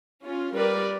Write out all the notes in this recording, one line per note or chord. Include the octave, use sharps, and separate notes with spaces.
C#4 F4
G3 A#4 B4 D5